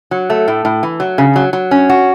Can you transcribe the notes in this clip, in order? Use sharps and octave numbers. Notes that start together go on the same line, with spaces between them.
F#3
A3
A2
A2
E3
F#3
C#3
F#3
F#3
C#4
F#4